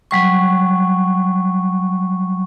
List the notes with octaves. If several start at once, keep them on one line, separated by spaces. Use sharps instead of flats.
F#3 G3 C#6